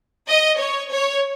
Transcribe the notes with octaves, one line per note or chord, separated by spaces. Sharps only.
D#5
C#5
C#5